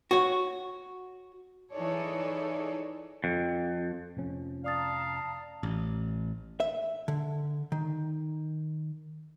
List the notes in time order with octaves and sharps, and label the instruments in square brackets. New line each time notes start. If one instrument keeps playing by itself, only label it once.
[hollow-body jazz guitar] F#4 C#5
[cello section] E3 D#4 G#4 A4 C#5 D5
[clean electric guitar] F2
[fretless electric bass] F1 F3 C#4
[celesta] D5 D#6 A6 [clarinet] F5 [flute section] A5 A#5
[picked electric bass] A1
[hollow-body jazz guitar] E5
D3
D#3